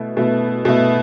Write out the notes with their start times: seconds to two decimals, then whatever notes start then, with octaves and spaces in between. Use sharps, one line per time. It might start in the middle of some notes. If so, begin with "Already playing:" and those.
Already playing: B2 A3 E4
0.17 B2 A3 E4
0.65 B2 A3 E4